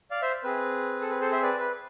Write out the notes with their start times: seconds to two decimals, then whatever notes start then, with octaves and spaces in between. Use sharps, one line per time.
0.11 D5 F5
0.22 C5 E5
0.44 C4 G#4 B4
1.01 A4
1.10 B4
1.21 A4 C5
1.31 C5 E5
1.43 B4 D5
1.60 B4